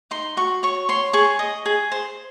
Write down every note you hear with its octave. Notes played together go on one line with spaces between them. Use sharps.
D#4 C6
F#4 C#6
C#5 C#6
C#5 C6
G#4 C#6
D#5
G#4
C5